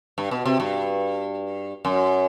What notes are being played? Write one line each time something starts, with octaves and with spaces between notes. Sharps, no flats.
G2
B2
C3
G2
F#2